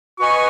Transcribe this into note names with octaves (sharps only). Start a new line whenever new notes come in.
F#4 B4 D#5 G#5 C#6